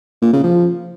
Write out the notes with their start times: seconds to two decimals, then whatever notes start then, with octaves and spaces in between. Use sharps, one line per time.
0.22 A#2
0.33 C#3
0.43 F3